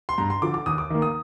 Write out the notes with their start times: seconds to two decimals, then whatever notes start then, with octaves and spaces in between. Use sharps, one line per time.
0.09 C6
0.18 G2 A#5
0.30 C6
0.42 D3 F3 D6
0.54 D6
0.66 D#2 D#6
0.78 D6
0.90 D#3 A#3
1.02 D#6